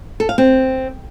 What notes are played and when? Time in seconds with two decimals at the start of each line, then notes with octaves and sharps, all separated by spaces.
0.20 A4
0.29 F5
0.38 C4